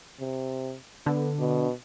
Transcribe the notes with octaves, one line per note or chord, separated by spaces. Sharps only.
C3
D3 B3
B2